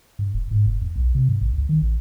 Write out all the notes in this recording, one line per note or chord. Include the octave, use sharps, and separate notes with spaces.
G2
E1
G#2
F1
E2
B1
C3
G2
A1
C#2
D#3
A1